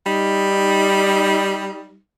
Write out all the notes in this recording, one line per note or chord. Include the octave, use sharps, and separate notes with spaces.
G3 D#4